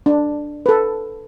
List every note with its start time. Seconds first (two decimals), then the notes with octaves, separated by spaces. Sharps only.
0.06 D4
0.66 A4 B4